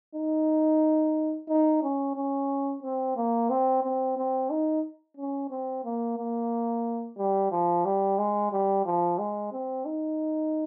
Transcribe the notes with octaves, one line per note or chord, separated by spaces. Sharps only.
D#4
D#4
C#4
C#4
C4
A#3
C4
C4
C4
D#4
C#4
C4
A#3
A#3
G3
F3
G3
G#3
G3
F3
G#3
C4
D#4